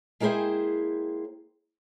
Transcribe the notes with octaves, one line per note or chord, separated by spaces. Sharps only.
G#3 A#3 E4 G#4 C5 G5